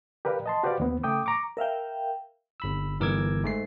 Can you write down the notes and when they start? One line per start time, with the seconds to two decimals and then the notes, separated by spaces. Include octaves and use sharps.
0.25 G4 A#4 B4 D5 F5
0.46 D#5 A5 C6
0.64 F#4 G4 B4 C5 D5 F5
0.80 D#2 B3 C4
1.04 C#3 A3 G5 D6 D#6
1.26 A#5 C#6 D6
1.57 A#4 E5 F5 G5
2.60 G1 B5 E6
3.00 G1 E3 A#4 D6 E6 G#6
3.44 G#2 A3 C7